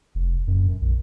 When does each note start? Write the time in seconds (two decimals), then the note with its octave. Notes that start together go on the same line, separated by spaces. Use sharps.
0.15 F1
0.47 F#2
0.68 F#2
0.81 A#1